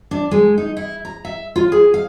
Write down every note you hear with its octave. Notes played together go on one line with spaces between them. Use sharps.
D4
G#3
D#4
E4
A#5
E5
F4
G#4
F5